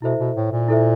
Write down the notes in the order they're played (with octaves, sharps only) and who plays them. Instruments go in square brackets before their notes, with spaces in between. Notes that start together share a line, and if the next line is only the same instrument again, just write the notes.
[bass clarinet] B2 [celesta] E4 A4 C5 E5
[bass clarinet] B2
A2
A#2
[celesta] E4 A4 C5 E5